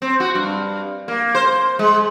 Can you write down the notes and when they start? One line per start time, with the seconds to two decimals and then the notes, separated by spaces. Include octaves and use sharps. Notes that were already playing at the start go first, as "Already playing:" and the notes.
0.02 C4
0.20 F#4
0.35 G2
1.08 A#3
1.35 C5
1.79 G#3